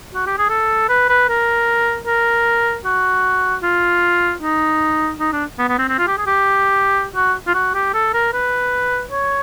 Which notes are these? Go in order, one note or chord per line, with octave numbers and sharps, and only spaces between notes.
F#4
G4
G#4
A4
B4
B4
A#4
A#4
F#4
F4
D#4
D#4
D4
B3
B3
C4
C4
F4
G4
G#4
G4
F#4
F4
F#4
G4
A4
A#4
B4
C#5